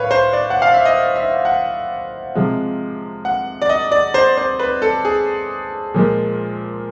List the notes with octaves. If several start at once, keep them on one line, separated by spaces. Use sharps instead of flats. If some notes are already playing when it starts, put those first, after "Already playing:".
Already playing: A2 B4 C#5 F5
C5
D5
F#5
F5
E5
D#5
E5
F#5
C3 F3 G#3
F#5
D5
D#5
D5
C5
C5
B4
A4
G#4
A#2 F3 G#3